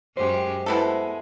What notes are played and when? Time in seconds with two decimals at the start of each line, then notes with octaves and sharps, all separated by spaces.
0.17 F#2 G#3 G4 C5
0.66 B2 G#3 E4 A4